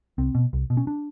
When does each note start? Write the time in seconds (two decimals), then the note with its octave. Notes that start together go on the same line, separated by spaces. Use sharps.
0.18 C2 C4
0.35 B2
0.53 C2
0.70 B2
0.77 C#4
0.87 D4